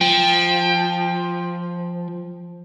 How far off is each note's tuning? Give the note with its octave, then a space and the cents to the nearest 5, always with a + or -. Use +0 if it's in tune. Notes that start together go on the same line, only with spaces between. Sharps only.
F3 +0 G5 +20